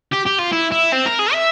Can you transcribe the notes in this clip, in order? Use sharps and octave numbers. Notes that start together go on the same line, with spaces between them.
G4
G4
F4
E4
E4
C4
A#4
G#4
E5